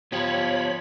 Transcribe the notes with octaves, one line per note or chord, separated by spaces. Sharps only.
F3 B3 G4 C#5 B5